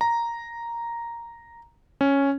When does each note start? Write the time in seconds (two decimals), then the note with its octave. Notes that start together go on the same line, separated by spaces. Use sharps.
0.01 A#5
2.01 C#4